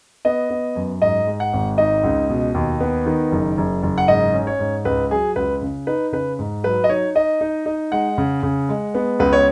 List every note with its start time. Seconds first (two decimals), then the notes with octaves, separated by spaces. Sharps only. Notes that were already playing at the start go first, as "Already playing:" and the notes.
0.25 B3 D#5
0.50 B3
0.76 F#2
1.02 G#2 D#5
1.27 G#3
1.40 F#5
1.53 G#1
1.78 D#4 D#5
2.04 C#2
2.29 B2
2.54 D#2
2.81 B3
3.06 D#3
3.31 F#1
3.57 F#1
3.83 F#1
3.98 F#5
4.08 G#2 D#5
4.34 C#4
4.47 C#5
4.59 G#2
4.85 C#2 B4
5.10 F#3 G#4
5.36 C#2 B4
5.62 C#3
5.87 D#4 B4
6.12 C#3 B4
6.39 G#2
6.64 F#3 B4
6.84 D#5
6.89 D#4 C#5
7.15 D#4 D#5
7.41 D#4
7.66 D#4
7.92 G#3 F#5
8.18 C#3
8.43 C#3
8.69 G#3
8.95 B3
9.19 C#2 B4
9.33 C#5